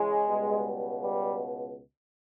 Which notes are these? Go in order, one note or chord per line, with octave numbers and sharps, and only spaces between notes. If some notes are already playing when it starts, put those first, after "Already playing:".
Already playing: C#3 E3 G#3
C#2 B2 G3
G3